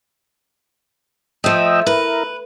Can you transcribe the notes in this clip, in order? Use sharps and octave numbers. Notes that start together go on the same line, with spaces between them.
F3 A3 D#5 G5 E6
E4 A#4 B4